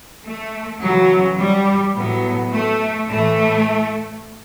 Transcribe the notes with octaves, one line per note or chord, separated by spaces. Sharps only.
A3
C#3 E3 F#3
G3
A2 F#3 B3
A3
A2 E3 A3